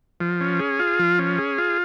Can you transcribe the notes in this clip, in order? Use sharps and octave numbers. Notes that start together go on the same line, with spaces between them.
F3
C#4
G#4
F4
F3
C#4
G#4
F4